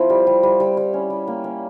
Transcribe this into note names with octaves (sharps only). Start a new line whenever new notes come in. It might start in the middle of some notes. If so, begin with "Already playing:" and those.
Already playing: F3 C4 E4
G3
G3
G3
G3
G3
C#4
G3
A#3
C#4